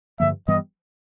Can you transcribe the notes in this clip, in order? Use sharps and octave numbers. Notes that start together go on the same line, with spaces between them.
G2 D3 F3 A#3 E5
G2 E3 G3 B3 D#5